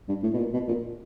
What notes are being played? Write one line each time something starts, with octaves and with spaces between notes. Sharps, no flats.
G2
A2
B2
A#2
B2
A#2